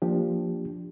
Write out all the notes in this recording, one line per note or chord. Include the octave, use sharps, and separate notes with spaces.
F3 A#3 D4 G4